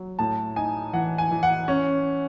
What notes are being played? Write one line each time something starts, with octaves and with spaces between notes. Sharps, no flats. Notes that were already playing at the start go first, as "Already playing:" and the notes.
Already playing: F#3
A2 A5
D#4 G#5
E3 F#5
G#5
E3
F#5
C#4